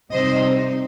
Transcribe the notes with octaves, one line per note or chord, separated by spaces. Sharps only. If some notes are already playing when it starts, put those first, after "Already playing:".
C3 G3 C4 D#4 C5 D#5